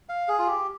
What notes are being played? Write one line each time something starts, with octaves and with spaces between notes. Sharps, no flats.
F5
G#4
F4
G4